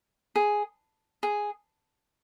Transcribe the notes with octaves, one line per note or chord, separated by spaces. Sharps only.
G#4
G#4